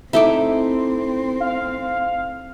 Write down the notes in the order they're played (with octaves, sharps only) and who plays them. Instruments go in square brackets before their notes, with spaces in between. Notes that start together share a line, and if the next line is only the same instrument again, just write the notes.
[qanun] A3 D#4 E4 [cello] C4 [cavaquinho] E5 D6
[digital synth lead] F5